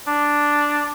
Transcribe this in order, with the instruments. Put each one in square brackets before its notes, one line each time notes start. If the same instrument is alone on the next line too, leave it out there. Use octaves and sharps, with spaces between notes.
[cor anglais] D4